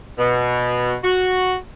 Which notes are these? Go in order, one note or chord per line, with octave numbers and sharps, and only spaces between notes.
B2
F#4